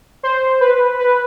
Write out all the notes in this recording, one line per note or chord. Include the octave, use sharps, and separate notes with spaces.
C5
B4
B4